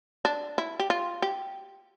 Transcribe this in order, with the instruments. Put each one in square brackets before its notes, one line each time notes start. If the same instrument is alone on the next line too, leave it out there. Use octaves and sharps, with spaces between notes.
[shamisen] D4
E4
G4
F4
G4